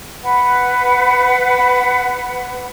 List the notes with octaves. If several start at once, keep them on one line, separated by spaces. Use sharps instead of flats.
B4 F#5